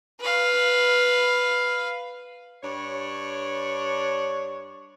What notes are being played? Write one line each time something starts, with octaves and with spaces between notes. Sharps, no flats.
B4 F5
G2 D4 C#5